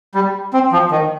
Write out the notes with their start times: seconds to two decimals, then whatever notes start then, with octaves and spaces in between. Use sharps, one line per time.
0.15 G3
0.53 C4
0.72 F3
0.91 D#3